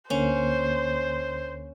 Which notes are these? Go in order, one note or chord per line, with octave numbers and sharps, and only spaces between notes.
D2 D3 A#3 C#4 C5